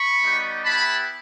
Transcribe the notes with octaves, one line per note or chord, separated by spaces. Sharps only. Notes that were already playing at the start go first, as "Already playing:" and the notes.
Already playing: B5 C#6
G3 B3 D#4 G4
B3 E4 G4 A5 B5